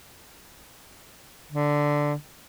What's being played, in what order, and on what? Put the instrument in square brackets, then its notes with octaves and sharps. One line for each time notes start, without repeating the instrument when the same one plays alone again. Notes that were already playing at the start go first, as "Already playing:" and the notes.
[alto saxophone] D3